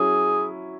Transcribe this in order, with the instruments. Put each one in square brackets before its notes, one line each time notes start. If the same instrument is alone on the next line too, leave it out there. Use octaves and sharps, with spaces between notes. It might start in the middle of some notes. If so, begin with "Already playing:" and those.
Already playing: [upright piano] F#3 C#4 E4 [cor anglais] G#4